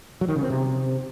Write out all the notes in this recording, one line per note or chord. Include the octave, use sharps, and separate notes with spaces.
F#3
D#3
C#3
C4
C3